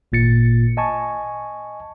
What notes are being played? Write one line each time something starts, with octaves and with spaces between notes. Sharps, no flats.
G#1 A#2 A6 C#7
D#5 G#5 A5 C#6